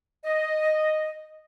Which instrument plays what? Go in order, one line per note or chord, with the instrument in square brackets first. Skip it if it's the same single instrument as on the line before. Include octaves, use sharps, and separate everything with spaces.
[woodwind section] D#5